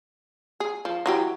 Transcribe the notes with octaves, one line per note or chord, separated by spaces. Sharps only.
G#4
F3
E3 F#3 G4